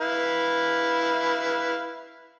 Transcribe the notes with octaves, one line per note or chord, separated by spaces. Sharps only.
E4 B4 F5